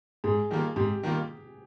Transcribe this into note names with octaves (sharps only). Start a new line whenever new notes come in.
G#2 G#4
D#3 G3 A#3 F4
G#2 G4
D#3 G3 A#3 F4